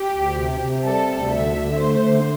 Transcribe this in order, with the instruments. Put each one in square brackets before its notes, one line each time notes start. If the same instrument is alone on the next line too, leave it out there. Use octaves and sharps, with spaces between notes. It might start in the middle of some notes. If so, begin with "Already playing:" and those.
Already playing: [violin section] G4
[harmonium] D2
C3
C3
[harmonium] G3 [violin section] A4
[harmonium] D2
[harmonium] D3 [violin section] E5
[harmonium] D3
[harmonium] A3 [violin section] C5
[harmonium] D3